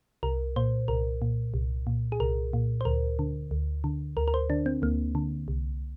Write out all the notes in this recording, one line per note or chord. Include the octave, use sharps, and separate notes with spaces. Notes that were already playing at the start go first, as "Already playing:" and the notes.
C2 A#4
A#2 C5
C2 A#4
A#2
C2
A#2
G#4
C2 A#4
A#2
C5
D2 A#4
D3
D2
D3
D2 A#4
A#4
C5
D3 D4
C4
D2 A#3
D3
C2